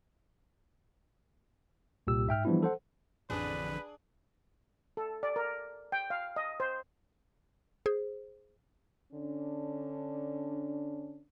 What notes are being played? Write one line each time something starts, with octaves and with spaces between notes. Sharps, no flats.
C2 A#2 G4 E6
G#2 E5 G5 F6
E3 F3 G3 B3 D4 E4
A4 C5 F#5
A1 F2 D3 D4 G#4 B4
A4
D5
A#4
G5
F5
D#5
C5
G#4 C5
D3 C#4 D4